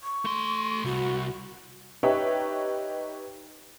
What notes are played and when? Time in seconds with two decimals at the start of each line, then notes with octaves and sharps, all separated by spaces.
0.04 C#6
0.25 A3 C6
0.85 C2 F#4
2.03 D#4 G4 B4 C#5 E5 C#6